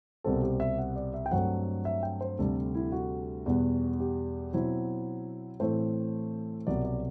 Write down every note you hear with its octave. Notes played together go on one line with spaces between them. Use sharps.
C2 B2 G3 C4 A4
G4
E5
F#5
D5
E5
G5
G2 F#3 A3 C4 F#5
E5
G5
C5
D2 C3 G3 A4
E4
F#4
E2 B2 G3 B3
G4
B2 F#3 C4 E4
A2 E3 A3 C4 C5
C2 B2 F#3 D5
D5